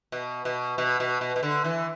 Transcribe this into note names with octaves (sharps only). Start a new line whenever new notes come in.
B2
B2
B2
B2
B2
B2
D3
E3